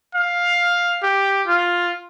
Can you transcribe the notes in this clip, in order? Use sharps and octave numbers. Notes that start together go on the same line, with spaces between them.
F5
G4
F4